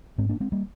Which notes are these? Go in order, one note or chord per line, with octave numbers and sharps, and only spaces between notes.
G#2 G#3 C4
A#3 D4
G#3 C4
G3 A#3